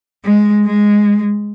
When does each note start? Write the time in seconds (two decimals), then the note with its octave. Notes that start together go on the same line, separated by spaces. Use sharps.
0.25 G#3
0.65 G#3